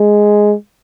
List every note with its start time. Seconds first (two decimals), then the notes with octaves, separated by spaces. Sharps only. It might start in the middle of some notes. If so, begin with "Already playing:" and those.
Already playing: G#3